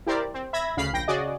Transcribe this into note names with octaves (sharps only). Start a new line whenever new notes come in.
E4 G4 A#4 C5 D5
C4
E5 B5 G#6 A#6
D2 C#3 F5 B5 C7
A#1 G5 A#6
C#3 F#4 G#4 D5 D#5